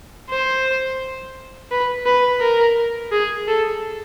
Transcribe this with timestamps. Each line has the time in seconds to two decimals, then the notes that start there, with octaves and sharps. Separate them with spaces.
0.30 C5
1.71 B4
2.06 B4
2.41 A#4
3.12 G#4
3.48 A4